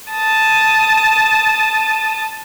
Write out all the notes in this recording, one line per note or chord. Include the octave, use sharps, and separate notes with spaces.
A5 D#6